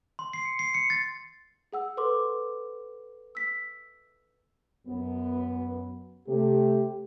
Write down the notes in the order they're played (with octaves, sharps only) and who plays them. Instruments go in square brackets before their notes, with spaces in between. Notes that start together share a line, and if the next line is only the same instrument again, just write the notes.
[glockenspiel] C6
C7
C#7
C7
C#7
A6
[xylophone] G#4 F#5 E6
A4 B4 C5 C6 D6
E6 B6
[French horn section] F#2 B3
[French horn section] C3 A3 [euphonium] G4